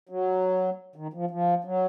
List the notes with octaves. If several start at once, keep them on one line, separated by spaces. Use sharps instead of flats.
F#3
D#3
F3
F3
F#3